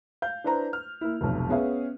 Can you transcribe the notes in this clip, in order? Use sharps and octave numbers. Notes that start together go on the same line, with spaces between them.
F5 G6
D4 E4 B4 C5 A#5
F6
A#3 E4
F1 B1
B3 C#4 G#4 B4 E5 F5